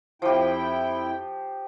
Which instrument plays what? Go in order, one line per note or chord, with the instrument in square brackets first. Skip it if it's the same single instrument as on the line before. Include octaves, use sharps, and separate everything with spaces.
[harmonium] F2 E4 G5 [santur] F3 G4